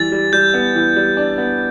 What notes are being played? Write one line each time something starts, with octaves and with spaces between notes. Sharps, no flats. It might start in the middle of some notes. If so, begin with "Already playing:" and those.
Already playing: E3 G3 A6
G3
G3 G6
B3
E3
G3
D4
B3